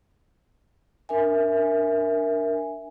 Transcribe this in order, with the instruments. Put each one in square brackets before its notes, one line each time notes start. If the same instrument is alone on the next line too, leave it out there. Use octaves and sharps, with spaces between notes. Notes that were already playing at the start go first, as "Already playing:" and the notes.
[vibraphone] D4 A#4 E5 G#5